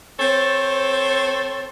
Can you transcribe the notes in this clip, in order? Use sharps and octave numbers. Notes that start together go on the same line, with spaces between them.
C4 A4 C5 C#5